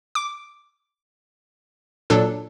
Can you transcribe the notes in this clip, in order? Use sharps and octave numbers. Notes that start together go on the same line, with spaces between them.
D6
A#2 F#3 D4 A4